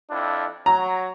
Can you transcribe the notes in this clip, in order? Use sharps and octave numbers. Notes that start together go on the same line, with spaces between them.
F2 D4 E4
F#3 A#5